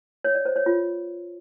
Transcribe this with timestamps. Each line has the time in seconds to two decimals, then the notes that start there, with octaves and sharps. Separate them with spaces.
0.24 C#5
0.35 D5
0.45 C5
0.56 C#5
0.66 F4